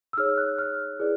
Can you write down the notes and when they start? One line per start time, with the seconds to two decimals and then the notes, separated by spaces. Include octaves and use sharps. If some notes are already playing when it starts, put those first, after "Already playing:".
0.13 E6
0.17 D#4 G#4 C#5 F6
0.38 F#6
0.58 F6
1.00 E4 G#4 B4 D5